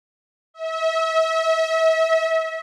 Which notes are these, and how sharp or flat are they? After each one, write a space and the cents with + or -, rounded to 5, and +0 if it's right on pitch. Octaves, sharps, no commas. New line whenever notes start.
E5 -35